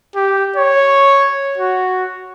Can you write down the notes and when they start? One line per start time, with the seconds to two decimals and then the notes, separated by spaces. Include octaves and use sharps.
0.16 G4
0.56 C#5
1.58 F#4